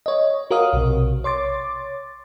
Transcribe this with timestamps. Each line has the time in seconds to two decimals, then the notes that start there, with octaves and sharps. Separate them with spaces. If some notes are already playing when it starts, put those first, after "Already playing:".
0.06 C#5 D#5
0.51 F#4 A#4 C#5 F5 D#6
0.73 B1 C3
1.24 C#5 C6 D6 A6